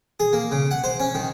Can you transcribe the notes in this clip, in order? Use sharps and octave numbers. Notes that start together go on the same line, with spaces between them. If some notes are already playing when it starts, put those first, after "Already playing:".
G#4
A#3
C#3
F#5
C5
C#4
D#3